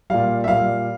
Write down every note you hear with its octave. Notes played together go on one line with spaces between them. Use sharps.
A#2 G3 F5
E5
A#2 G3 F5